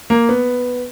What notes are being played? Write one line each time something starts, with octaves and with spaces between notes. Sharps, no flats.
A#3
B3